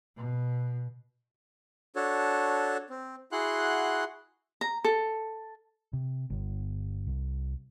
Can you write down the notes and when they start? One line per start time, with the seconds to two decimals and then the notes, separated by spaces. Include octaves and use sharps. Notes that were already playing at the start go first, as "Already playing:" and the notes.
0.16 B2
1.96 D4 F#4 A4 C#5
2.90 C4
3.32 E4 F#4 G#4 F#5 C6 F#6
4.61 A#5
4.84 A4
5.93 C3
6.30 G1
7.07 C2